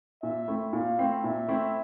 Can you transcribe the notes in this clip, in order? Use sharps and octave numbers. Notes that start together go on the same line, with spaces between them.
A#2 E5
A3 C4 E4
A#2 F5
A3 C4 E4
A#2 E5
A3 C4 E4